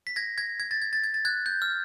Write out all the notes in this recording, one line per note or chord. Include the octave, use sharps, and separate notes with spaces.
B6
G#6 A#6
G#6 A#6
G#6
A6
G#6
A6
G#6
A6
F#6 G#6
G6
F6